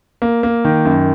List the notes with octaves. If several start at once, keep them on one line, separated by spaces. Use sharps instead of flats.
A#3
A#3
D#3
F#2